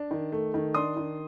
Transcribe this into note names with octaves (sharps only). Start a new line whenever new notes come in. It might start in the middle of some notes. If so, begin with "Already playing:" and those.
Already playing: D4
D#3
A3
D#3
D4 C6 D#6
D#3